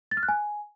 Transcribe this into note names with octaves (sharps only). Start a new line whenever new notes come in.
A6
F6
F#6
G#5